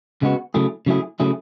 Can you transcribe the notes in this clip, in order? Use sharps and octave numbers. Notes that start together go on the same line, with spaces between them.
C#3 G#3 B3 F#4
C#3 F#3 A3 E4 G#4
C#3 F#3 A3 E4 G#4
C#3 F#3 A3 E4 G#4